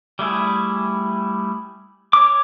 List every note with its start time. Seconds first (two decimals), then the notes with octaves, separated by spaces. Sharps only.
0.19 G3 A3 E4 G#4
2.13 C#5 D6